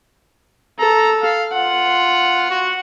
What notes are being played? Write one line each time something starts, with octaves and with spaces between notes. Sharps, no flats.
A4 A#5
F5
F4 F#5
F#4